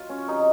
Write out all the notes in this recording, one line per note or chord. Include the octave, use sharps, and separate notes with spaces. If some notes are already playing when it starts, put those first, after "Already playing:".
Already playing: F#3 F4
C#4
C3 D#3 F#3 D#4